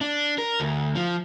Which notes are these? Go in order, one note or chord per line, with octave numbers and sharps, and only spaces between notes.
D4
A#4
D2
F3